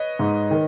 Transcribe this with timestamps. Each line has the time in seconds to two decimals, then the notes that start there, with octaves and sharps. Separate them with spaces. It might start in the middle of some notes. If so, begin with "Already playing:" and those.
Already playing: B4 C#5 D#5
0.19 G#2
0.51 D#3